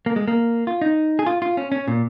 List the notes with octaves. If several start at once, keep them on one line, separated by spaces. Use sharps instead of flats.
A#3
G#3
A#3
F4
D#4
G#4
F4
F4
C#4
C#4
A#2